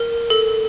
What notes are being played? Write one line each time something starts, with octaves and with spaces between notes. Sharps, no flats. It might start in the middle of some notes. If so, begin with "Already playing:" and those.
Already playing: A#4
A4